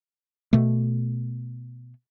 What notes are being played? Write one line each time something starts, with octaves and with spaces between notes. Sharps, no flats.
B2 A3